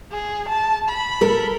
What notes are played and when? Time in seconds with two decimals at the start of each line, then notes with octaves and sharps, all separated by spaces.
0.12 G#4
0.49 A5
0.89 B5
1.21 A4 A#4